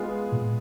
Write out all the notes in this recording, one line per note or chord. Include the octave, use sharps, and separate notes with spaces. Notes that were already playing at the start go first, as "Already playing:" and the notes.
Already playing: G#3 B3 F4 G#4
A#2